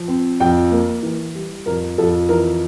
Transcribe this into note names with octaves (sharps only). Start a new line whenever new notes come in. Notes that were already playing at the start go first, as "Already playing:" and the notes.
Already playing: F3
C4
F2 G5
A#3
E3
G3
F2 A#4
F2 A4
E3 A#4